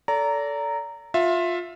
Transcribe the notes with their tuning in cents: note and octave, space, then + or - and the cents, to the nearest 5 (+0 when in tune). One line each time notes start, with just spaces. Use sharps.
A4 +5 D5 -35 A#5 -10
F4 +20 E5 +5